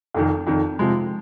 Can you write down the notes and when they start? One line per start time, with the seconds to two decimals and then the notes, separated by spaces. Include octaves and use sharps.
0.14 F1 F2 D#3
0.47 F1 F2 D#3
0.79 C3 F3 G#3